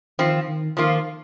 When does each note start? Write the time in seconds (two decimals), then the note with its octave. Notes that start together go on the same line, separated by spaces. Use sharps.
0.19 D#3 F3 C4 F4
0.48 D#3
0.77 D#3 F3 A#3 F4